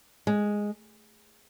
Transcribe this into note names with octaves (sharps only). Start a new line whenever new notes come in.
G#3